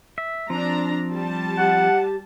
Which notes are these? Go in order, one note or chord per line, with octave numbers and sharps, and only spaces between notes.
E5
F3 C4 D4 A#5
G3 A5
G4 F#5